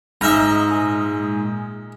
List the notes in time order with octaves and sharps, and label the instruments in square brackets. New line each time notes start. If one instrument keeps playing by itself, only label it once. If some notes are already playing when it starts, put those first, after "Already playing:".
[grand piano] G#2 [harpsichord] D#5 E5 A#5 [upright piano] G#5 F6 A#6
[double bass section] A#2 G#3 [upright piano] G#5 D#6